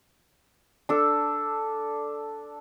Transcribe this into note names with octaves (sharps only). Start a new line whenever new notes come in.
D4 A4